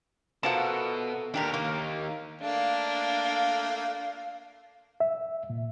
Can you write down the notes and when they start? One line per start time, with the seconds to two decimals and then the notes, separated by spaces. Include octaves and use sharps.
0.43 B2 F3 F4 A4 A#4 E5 F#5
1.34 D#2 D4 G4 A#4
1.54 A#3
2.41 A3 A#3 D4 F5
5.00 E5
5.50 A#2